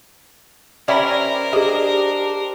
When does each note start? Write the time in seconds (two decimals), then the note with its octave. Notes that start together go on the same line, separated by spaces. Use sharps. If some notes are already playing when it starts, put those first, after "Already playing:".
0.88 C#4 G4 A#4 C5 D5 E5 B5
1.53 D4 G4 G#4 D#5